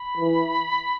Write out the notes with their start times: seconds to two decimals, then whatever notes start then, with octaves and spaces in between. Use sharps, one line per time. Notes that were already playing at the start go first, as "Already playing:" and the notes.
Already playing: B5
0.17 E3